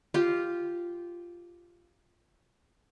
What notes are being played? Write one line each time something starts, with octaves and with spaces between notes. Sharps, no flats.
F4 G4